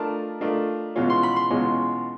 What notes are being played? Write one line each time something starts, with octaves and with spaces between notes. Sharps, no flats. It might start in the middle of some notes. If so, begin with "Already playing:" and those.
Already playing: A3 D4 F4 A#4 D#5 A5
A3 D4 F4 A#4 D#5
E2 B2 G#3 C#4 F4
C6
B5
C6
E2 B2 G#3 C#4 F4